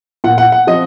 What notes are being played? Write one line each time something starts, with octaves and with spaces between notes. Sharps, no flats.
A#2 F#5
F#5
F#5
F3 C4 D#5